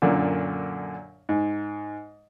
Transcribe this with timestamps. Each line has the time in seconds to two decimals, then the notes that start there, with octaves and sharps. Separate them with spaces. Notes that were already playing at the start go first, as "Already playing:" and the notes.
0.02 F#2 A#2 D3
1.29 G#2